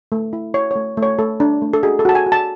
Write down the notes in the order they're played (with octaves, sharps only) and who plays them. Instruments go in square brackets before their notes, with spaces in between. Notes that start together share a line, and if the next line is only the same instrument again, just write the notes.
[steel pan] A3
E4
E4 C#5
A3 C#5
A3
C#5
A3 A4
D4
A3
A4
F#4 G#4
A4
F#4 A5
G#5
F#4
A5